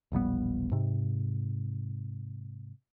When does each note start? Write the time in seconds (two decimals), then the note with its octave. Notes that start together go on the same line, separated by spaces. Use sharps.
0.12 E1 A#1 G3 B3
0.72 G#2 C3